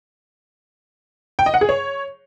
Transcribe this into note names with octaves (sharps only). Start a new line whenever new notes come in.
G5
D#5
F#5
G#4
C#5